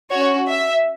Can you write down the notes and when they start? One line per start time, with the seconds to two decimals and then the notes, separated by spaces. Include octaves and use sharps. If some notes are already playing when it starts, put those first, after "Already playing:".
0.11 C#4 F#4 C#5
0.48 E5